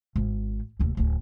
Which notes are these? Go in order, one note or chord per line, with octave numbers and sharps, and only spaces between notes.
G#1
F1 D#2
D1 D2